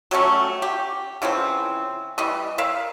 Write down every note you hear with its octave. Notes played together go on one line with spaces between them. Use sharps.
F#3 G3 A3 C#4
G4
C#3 E3 F3 C4
E3 G3 D#5
A#4 E5 F5